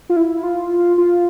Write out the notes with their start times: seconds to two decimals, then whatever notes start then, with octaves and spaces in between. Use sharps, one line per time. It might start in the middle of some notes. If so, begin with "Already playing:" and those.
0.10 F4
0.16 E4
0.43 F4
0.98 F4